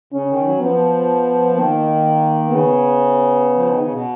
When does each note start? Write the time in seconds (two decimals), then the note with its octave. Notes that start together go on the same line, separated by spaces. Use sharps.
0.13 C#3 C#4
0.30 D#3
0.44 F#3
0.60 F3 B3
1.55 D#3 A#3
2.50 C#3 B3
3.56 F3
3.68 D#3
3.81 C#3
3.92 B2